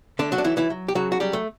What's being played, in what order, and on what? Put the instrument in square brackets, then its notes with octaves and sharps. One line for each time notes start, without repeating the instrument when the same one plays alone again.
[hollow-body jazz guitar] D3 A3 D4
F#3 F#4
D4
E3 F#3 E4
E3 E4
F#3
G4
C#3 F#3 F#4
F#4
F#3 G3 G4
A3